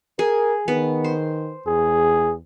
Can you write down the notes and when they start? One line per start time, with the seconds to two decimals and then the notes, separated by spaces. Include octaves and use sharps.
0.19 G#4 A#4
0.68 D#3 B3
1.04 C5
1.67 E2 G#4